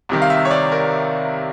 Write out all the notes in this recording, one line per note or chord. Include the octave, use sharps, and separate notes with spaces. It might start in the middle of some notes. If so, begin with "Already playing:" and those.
C2 C3 D#3
F5
E5
C#5
D5
A#4